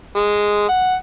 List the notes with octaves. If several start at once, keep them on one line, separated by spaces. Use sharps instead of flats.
G#3
F#5